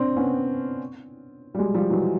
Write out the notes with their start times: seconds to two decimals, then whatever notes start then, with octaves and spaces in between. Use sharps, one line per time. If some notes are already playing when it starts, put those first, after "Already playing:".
Already playing: C4 D4
0.16 B3 C#4
1.54 G3
1.58 F#3 G#3
1.74 F3 G3
1.90 E3 F#3